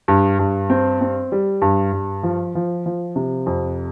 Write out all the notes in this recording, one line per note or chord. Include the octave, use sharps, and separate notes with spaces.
G2
G2
C4
C4
G3
G2
G2
F3
F3
F3
C3
F2